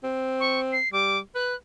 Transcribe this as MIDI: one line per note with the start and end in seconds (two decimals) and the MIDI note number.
0.03 0.78 60
0.40 0.60 85
0.72 0.91 96
0.93 1.20 55
0.93 1.18 86
1.35 1.54 71
1.35 1.56 90